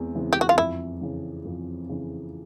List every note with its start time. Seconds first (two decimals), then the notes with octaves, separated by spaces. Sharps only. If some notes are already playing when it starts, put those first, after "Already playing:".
Already playing: E2 E3 G#3 C4
0.15 C#3 E3 G#3 C4
0.33 G4
0.41 F#4
0.49 F4
0.58 F2 E4
1.01 C#3 E3
1.45 F2
1.89 C#3 E3